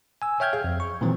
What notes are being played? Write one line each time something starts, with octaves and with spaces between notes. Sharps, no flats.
G#5 E6
C#5 E5 G5 F6 G6 G#6
G#4 F5
F2
C#6
A#2 D#3 E3 F#3 C4